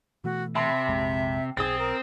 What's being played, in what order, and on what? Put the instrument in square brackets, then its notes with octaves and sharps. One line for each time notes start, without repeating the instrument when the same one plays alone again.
[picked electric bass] B2 E3 A3 [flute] F#4
[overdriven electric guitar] C3 [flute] E5 [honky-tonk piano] A5 B5 C6
[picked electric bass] A#1 F2 G#3
[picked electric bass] B1 [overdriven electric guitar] C4 [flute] G#4 [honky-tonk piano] D#6 A6
[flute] A#4